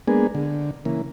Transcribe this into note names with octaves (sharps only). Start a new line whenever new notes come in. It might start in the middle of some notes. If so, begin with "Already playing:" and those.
G#3 A#3 B3 D4 G#4
D3
C#3 E3 A#3